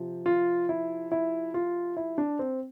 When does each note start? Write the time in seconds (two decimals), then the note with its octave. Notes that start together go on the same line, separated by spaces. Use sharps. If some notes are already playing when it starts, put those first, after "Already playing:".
Already playing: C3 F3
0.26 F4
0.69 E4
1.12 E4
1.54 F4
1.97 E4
2.18 D4
2.39 C4